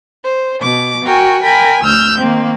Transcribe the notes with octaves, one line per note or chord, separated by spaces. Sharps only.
C5
B2 D6
F#4 A#4 G5 G#5
A#4 G5 G#5 B5
D2 E6 F6 G6
D#3 A#3 C4